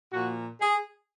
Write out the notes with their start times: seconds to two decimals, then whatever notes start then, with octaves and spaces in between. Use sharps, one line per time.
0.12 A#2 F3 A#3 F#4
0.61 G#4